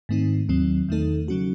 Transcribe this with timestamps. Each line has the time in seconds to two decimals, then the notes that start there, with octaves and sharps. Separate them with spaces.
0.09 G#2 D#3 A3 C4 D#4
0.49 D#2 D#3 F#3 C4
0.89 E2 D#3 A3 D#4 A4
1.28 C#3 F#3 C#4 F#4